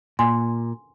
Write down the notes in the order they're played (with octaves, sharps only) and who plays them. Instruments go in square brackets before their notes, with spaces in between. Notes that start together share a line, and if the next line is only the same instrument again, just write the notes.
[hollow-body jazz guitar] A#2 [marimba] G#5 C6